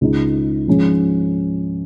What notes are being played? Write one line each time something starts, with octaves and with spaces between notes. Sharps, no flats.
C#2 C#3 G#3 D#4
G#2 F3 G#3 C#4